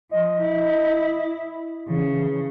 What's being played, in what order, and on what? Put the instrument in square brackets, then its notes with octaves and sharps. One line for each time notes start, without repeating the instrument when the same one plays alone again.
[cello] F3 [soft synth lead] D#5
[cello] E4
[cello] C#3 [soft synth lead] E3